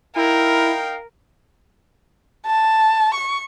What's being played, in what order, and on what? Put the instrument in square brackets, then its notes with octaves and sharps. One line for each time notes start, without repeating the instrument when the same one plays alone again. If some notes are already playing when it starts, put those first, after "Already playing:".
[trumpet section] D#4 F5 G5 [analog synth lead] E4 [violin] A#4
[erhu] A5
C#6